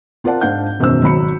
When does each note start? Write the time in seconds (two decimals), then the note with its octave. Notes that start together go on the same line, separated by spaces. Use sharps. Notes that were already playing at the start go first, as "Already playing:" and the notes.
0.24 C4 F4 A#4 D5 F#5 A5
0.41 G#2 D4 F5 F#5 G6
0.79 E1 F#2 B2 D#3 C5 E6
1.03 G#1 F#3 B5 C#7